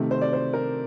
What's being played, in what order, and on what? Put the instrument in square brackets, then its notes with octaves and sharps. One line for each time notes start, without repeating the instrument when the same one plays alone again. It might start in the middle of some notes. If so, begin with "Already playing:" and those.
Already playing: [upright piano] C3 D#3 A3
C5
D5
C5
A#4